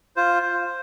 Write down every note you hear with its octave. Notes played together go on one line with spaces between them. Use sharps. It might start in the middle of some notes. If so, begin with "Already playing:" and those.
F4 C5
F4